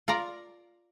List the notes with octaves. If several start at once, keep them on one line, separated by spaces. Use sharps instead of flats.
F4 A#4 D5 A#5